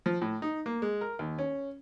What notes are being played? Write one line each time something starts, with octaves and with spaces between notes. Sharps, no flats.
F3
A2
D#4
A#3
G#3
A#4
D#2
C#4